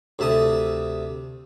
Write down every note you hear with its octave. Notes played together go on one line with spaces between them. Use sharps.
D2 C3 E5 A5 D#6